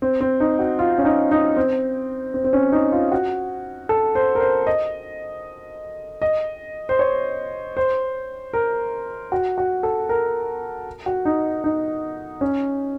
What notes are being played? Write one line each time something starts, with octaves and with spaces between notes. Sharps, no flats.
C4
C4
D#4
F#4
F4
C#4
D#4
D#4
C4
C4
C4
C#4
D#4
F4
F#4
A4
C5
A#4
C5
D#5
D#5
C5
C#5
C5
A#4
F#4
F#4
A4
A#4
F#4
D#4
D#4
C#4